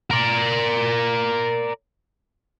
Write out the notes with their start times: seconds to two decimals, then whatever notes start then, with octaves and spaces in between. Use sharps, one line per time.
0.11 A#4 D5